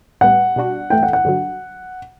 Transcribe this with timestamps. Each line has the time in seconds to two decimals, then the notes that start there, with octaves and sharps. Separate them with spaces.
0.21 A2 G3 B3 F#5
0.56 B2 G3 D4 F#4
0.90 G2 E3 A3 E4 G5
1.03 F#5
1.13 F#5
1.25 G2 D3 F#3